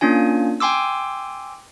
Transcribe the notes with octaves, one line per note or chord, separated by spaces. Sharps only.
A#3 C#4 D4 F4 G#5
G5 G#5 C6 D6 E6